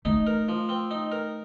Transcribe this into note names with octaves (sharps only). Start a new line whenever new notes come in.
A3 D#4
A#4
F3
C4
D#4
A#4